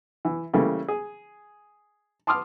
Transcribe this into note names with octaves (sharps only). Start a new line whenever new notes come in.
E3
C#3 E3 G3 A3 A#3
G#4
A5 C6 D6 D#6 F6